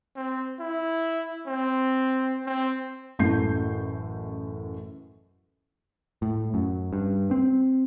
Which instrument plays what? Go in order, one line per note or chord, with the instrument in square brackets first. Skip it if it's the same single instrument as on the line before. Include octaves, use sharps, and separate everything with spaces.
[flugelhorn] C4
E4
C4
C4
[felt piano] A1 F#2 A2 A3 G6 C7
[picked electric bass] A2
F#2
G2
C4